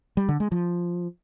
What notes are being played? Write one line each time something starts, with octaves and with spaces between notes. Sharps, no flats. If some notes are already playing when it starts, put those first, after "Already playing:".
G3
D3
G#3
F3